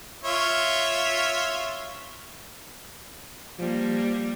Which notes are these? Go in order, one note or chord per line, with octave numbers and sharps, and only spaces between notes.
F4 C#5 E5
F3 G3 A#3